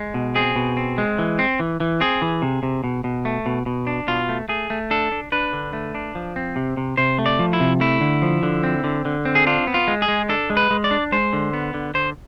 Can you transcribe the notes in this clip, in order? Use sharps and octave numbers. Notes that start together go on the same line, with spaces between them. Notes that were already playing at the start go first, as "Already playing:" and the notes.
Already playing: G#3
B2
C4 G#4
B2
C4
G#3
E3
C4
E3
E3
C4 G#4
E3
C3
C3
B2
B2
A3
B2
B2
D4
B2 F4
A3
A3 G#4
A3
D4 A4
D4
D4 B4
D3
A3
D4
F3
C4
C3
C3
C3 C5
A3
D5
F3
E4
C3
A3 E4
D3
F3
D3
C4
D3
D3
C4
G#4
D4 F4
B3
F4
G#3
G#4
G#3
D4 A4
G#3
B4
G#3
D5
D4
G#3 C5
D3
B3
D3
D3 C5